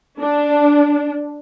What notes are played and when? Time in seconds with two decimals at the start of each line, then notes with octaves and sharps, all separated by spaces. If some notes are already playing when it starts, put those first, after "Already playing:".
0.20 D4